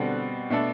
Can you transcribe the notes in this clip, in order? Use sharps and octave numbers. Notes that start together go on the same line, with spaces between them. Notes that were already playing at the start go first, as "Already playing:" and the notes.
Already playing: B2 D3 G3 C4 F#4
B2 A3 D4 A4